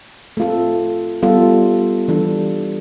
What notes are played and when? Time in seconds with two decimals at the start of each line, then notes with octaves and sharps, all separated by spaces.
0.37 A3 C4 F4 A4
1.22 G3 B3 F4 A4
2.08 E3 G3 D4 A4